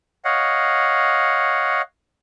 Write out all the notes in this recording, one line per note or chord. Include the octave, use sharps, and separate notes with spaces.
C#5 D#5 F5 F#5